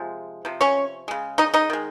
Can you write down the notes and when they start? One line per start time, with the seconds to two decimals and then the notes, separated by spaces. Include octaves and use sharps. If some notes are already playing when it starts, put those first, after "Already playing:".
Already playing: C3 F3 G#3
0.45 C3 F3
0.61 C#4 C#5
1.08 C#3 G#3
1.38 D#4 D#5
1.54 D#4 D#5
1.70 D#3 G#3